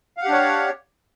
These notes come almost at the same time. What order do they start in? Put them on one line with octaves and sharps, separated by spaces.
F5 F#5 G4 D4 C#5